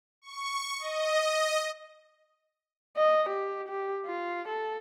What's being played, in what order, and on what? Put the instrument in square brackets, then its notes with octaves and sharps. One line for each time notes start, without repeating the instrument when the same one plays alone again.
[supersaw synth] C#6
D#5
[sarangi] D#5
G4
G4
F4
A4